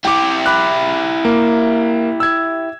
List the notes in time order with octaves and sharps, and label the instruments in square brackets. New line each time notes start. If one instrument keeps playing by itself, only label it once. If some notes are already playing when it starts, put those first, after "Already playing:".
[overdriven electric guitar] E4 G4 [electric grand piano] G5 D6
[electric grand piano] B5 D6 F#6
A#3
E6 G#6